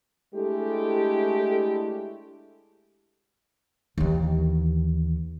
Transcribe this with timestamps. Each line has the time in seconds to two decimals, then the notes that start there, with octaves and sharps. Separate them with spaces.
0.34 G#3 A3 D4 E4 G4 A4
3.98 D#2 E3